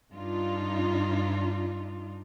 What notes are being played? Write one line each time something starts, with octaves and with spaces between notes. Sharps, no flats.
G2 D4 D#4 F4